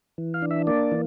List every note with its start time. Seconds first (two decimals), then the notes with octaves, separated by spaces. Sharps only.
0.18 E3
0.34 F5
0.42 D4
0.51 E5
0.67 A#3 D5
0.92 E3